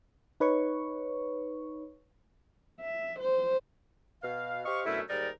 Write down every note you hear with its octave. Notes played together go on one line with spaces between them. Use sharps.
D#4 B4 C#5 C#6
E5
C5
B2 F5
G4 C5 D#5 F5 C#6
F#2 B2 D3 A3 C#4 E4
D#2 G#2 G3 D#4 A#4 D5